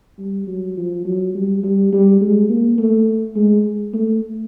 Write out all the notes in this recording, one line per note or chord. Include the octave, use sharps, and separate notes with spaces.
G3
F#3
F3
F#3
G3
G3
G3
G#3
A#3
A3
G#3
A3